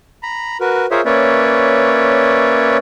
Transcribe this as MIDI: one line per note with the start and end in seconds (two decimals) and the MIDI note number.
0.23 0.57 82
0.23 0.57 83
0.61 0.86 66
0.61 0.86 70
0.61 0.86 71
0.91 1.01 65
0.91 1.01 68
0.91 1.01 70
0.91 1.01 72
0.91 1.01 73
0.91 1.01 76
1.05 2.77 58
1.05 2.77 61
1.05 2.77 71
1.05 2.77 73
1.05 2.77 74
1.05 2.77 76